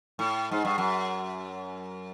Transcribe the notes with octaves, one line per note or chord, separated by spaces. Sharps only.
A2
G#2
G2
F#2